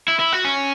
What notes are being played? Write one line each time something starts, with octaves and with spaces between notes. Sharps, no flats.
E4
E4
F#4
C#4